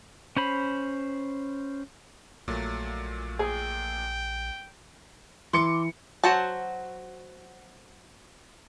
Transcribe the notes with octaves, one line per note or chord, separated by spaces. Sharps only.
C#4 C5 B5
A#1 A#2 F#3 A3
G#4 G5
E3 C6 D6 C#7
F#3 F#4 C5 A5